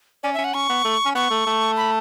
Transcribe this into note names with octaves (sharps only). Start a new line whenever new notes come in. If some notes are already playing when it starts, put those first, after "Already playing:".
C#4 D5
E5
C#4
F#5
C#4 C#6
B3
A3
C#4
B3 C#6
A3
A3
B5